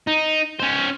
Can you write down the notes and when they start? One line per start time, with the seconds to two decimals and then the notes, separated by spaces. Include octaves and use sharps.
0.07 D#4
0.60 C#4 C5